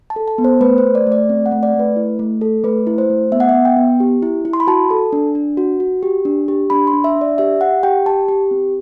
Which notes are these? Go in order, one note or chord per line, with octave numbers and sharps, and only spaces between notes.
A5
A4
A5
B3
C5
A3 B4
C5
A3
D5
A3 D5
C4
F#5
A3
D5
A3
B4
E4
A3
A4
A3 B4
E4
C5
A3
B3 E5
F#5
E5
B3
G5
B3
G4
E4
E4
C6
B5
F#4 A5
A4
D4
D4
F#4
F#4
G4
D4
G4
D4 B5
C6
D4
E5
D4
D5
G4 E5
G4 F#5
G4 G5
G4 A5
G4
C4